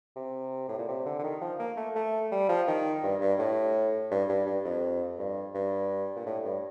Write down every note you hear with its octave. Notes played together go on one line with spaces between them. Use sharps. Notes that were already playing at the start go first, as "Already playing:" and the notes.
C3
A2
A#2
C3
D3
D3
D#3
F3
A#3
A3
A3
G3
F3
D#3
G2
G2
A2
G2
G2
G2
F2
G2
G2
A#2
A2
G2